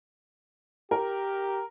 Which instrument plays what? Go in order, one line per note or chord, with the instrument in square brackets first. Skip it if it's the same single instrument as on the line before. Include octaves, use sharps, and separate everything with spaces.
[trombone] G4 [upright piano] A#4